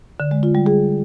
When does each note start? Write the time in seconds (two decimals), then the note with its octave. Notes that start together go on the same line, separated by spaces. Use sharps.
0.20 D3
0.31 G#3
0.43 F4
0.55 G3
0.66 G#4